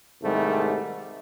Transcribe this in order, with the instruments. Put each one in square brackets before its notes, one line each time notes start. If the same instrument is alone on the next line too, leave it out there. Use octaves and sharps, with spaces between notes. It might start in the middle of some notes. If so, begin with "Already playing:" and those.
[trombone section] C2 G#2 D#3 G3 A3